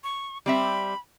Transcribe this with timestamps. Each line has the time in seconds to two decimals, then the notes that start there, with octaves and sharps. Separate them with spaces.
0.04 C#6
0.46 G3 C4 E5 B5